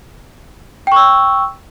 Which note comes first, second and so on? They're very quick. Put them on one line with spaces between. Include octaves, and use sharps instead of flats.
G5 C#6 E6